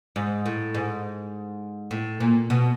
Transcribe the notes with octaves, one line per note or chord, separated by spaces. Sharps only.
G#2
A2
G#2
A2
A#2
B2